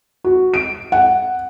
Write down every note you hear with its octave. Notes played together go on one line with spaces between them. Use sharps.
F#4
D7
F#5